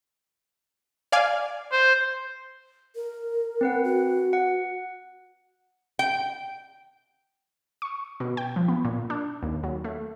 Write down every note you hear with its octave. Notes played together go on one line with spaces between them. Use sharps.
D5 F5 G#5
C5
A#4
C4 B4 F#5
F#4
F#5
G5
C#6
B2
G5
F3
B3
A#2
D4
D#2
F#3
A3